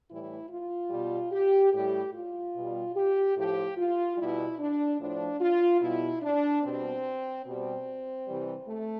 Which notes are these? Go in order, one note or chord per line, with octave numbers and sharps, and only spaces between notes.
A2 E3 G3 E4
F4
B2 G3
G4
A2 G3 G4
F4
B2 G3
G4
A2 F3 G4
F4
B2 G3 E4
D4
A2 F3 D4
F4
B2 G3 E4
D4
B2 G3 C4
B2 G3 C4
C3 E3 G3
A3